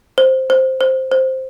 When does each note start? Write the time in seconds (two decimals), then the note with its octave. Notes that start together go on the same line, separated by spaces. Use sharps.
0.18 C5
0.50 C5
0.81 C5
1.12 C5